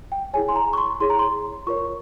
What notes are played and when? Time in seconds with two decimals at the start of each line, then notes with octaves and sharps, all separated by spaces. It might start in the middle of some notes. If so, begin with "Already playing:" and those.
0.12 G5
0.33 E4 G#4 C#5 G#5
0.49 C6
0.56 A#5
0.73 C#6
0.77 C6
1.00 E4 G#4 C#5 C6
1.10 A#5
1.19 C6
1.67 F4 A#4 C#5 C#6